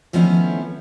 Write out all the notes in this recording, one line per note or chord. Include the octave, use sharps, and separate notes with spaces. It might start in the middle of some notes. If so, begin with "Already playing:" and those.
D#3 F3 A3 B3 C#4 E4